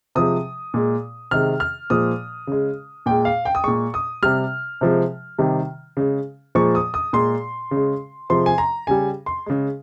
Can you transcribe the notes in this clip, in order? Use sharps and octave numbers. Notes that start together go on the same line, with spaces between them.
C3 F3 G#3 D#6
A#2 G#3
C3 D#3 G#3 F6
F6
A#2 F3 G#3 D#6
C#3 G#3
A#2 G#3 G5
F5
G5
D#6
A#2 G#3 C#6
D#6
C3 G3 F6
C3 F3 G#3
C3 D#3 G3
C#3 G#3
A#2 F3 G#3 C#6
D#6
D#6
A#2 G#3 C6
C#3 G#3
C3 F3 G#3 C6
G#5
A#5
C#3 G3 G#5
C6
C#3 G#3